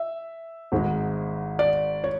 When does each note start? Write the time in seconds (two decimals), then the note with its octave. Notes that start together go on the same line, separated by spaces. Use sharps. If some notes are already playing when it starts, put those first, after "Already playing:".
Already playing: E5
0.72 G#1 G#2 G#3
1.59 D5
2.04 C#5